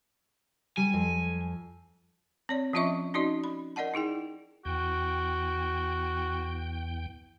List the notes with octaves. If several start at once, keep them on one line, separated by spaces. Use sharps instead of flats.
G3 G#5 D#7
F2
C4 C#5 D5
F3 C#4 F4 D#5 E5 C#6
C#4 D#4 F#4 D5 D#5
B5
A#4 D5 D#5 F#5 A5
D#4 E4 G#4 G5
E2 F#4 G5